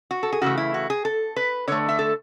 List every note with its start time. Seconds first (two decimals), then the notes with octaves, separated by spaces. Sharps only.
0.11 F#4
0.23 A4
0.32 G#4
0.42 C#3 E3 A3 F#4
0.57 E4
0.74 F#4
0.90 G#4
1.05 A4
1.36 B4
1.68 D3 A3 C#5
1.89 E5
1.99 A4